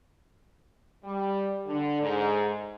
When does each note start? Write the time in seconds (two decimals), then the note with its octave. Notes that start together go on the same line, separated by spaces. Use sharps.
1.04 G3
1.66 D3
2.01 G#2